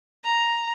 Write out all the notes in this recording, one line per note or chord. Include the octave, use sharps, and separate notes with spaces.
A#5